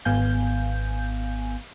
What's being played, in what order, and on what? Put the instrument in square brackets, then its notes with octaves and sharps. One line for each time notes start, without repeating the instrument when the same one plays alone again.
[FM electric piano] G#1 B3 F5 G#5 G6